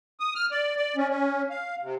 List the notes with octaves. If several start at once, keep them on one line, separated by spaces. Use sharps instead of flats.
D#6
F6
D5
D5
C#4
C#4
F5
C3